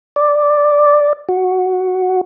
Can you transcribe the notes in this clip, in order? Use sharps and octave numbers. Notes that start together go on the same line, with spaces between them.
D5
F#4